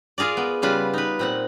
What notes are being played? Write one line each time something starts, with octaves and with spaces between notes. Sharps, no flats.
F4 G#4 A#4 D5
B3
C#3 G3 F4 B4
D#4 B4
A#2 C4 F#5